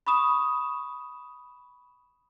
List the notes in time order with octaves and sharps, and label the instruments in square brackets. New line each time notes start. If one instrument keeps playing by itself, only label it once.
[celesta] B5 C#6 D#6 E7